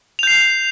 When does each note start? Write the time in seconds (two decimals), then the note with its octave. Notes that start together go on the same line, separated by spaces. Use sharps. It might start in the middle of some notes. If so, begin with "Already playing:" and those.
0.19 F7
0.23 G6
0.27 C7